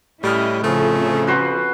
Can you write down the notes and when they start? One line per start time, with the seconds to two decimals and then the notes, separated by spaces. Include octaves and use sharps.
0.23 A2 G3 C#4 E4 D#5 F6
0.63 F2 C#3 F3 A3 G#4 C5
1.27 F#4 B4 C5